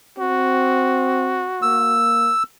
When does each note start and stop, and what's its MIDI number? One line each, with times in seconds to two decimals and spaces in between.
0.18 1.49 60
0.18 2.07 66
1.62 2.30 58
1.62 2.43 88